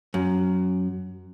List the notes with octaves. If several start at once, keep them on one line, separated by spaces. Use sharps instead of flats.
F#2